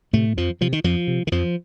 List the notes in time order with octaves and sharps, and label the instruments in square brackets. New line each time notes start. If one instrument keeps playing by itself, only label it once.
[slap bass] A2 C3 A3
F2 F3
C3 F3
D#3
F2 F3
C3
D#3
F2 F3